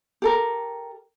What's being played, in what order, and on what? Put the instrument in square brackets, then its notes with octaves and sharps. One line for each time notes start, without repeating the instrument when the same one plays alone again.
[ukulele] G4 A4 A#4